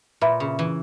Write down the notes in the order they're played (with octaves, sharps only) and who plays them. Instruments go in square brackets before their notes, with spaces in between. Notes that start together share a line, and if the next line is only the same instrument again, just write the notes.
[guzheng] A#2 [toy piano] B4 E5 B5
[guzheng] C#3
E3